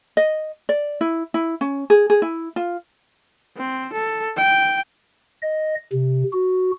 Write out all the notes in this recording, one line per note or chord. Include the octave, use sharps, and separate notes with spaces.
D#5
D5
E4
E4
C#4
G#4
G#4
E4
F4
C4
A4
G5
D#5
C3
F#4